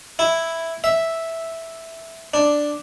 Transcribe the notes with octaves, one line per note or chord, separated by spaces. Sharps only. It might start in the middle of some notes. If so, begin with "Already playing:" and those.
E4
E5
D4